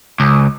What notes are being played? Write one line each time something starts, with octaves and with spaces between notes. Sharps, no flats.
C#2